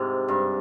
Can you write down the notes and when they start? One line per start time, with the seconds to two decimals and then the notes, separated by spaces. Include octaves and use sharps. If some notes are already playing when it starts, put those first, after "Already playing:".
Already playing: G#2 C3
0.28 G2